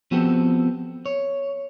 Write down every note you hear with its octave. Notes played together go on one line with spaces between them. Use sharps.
F3 B3 C4 F#4 G4 A4
C#5